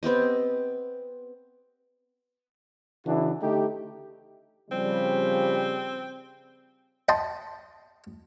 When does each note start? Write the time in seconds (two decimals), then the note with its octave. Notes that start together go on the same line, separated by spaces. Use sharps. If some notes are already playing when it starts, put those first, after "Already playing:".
0.03 B3 C4 G4 D#5
3.06 C#3 E3 D4 E4 F#4
3.42 D3 A3 D#4 G4
4.71 C#3 F3 G3 C4
7.09 D#5 G5 A5 C6